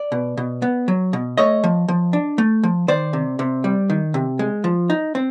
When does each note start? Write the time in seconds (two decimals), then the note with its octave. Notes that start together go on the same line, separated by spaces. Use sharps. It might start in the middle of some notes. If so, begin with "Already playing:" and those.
Already playing: D5
0.12 B2
0.37 B2
0.62 B3
0.88 F#3
1.13 B2
1.37 A3 C#5 D#5
1.64 F3
1.88 F3
2.13 D4
2.38 A3
2.63 F3
2.88 D#3 C5 D5
3.13 C3
3.39 C3
3.64 G3
3.90 D#3
4.14 C3
4.39 G#3
4.64 F3
4.90 D#4
5.15 C4